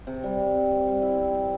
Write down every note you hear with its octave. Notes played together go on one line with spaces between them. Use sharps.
C3
G3
C3
C4
C4
G3
E4
C4
C4